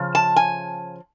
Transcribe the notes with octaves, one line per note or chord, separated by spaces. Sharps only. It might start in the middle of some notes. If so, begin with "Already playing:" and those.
Already playing: C#3 F3
A5
G#5